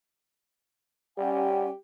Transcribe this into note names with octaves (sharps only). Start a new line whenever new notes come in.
G3 C#4 G4 F#5 G#5